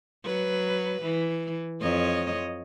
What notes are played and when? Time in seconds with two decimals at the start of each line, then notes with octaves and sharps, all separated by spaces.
0.25 F#3 B4
1.03 E3
1.81 F2 C#5 D#5